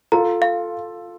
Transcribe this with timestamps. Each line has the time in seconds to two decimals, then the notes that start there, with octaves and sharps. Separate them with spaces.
0.12 F4 A4 A#5
0.42 F5